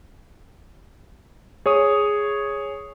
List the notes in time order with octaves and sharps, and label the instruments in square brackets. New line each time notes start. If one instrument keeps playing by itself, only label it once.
[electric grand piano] G#4 C#5 C#6 D#6